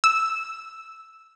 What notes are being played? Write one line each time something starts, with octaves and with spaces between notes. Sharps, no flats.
E6